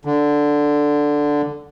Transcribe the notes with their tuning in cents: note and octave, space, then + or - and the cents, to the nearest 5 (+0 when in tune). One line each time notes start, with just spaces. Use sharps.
D3 +0